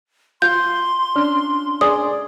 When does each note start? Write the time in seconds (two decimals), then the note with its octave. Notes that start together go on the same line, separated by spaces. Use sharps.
0.42 F4 C6 G6
1.16 C#4 D4 F6
1.81 G#4 D5 D#6